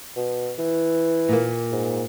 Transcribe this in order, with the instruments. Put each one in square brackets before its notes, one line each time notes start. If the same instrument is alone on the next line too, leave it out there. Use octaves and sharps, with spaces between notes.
[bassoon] B2
E3
[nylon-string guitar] A#2 A#3
[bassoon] G#2